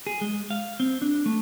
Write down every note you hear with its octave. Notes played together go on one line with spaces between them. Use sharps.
G#4
G#3
F5
C4
D4
A3